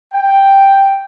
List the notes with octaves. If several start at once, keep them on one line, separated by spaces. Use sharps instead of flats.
G5